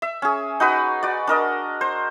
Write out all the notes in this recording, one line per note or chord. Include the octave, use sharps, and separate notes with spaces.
E5
C#4 G#4
D#4 F#4 B4
F#4 D5
D4 A#4 D#5
C5